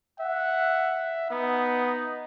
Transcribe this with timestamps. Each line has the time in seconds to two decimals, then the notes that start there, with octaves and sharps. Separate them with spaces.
0.20 E5 F#5
1.30 B3 D#4